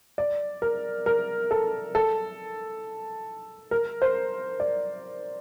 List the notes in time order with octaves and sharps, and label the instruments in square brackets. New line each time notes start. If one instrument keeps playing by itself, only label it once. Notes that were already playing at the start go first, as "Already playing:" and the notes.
[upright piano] D5
A#4
A#4
A4
A4
A#4
C5
D5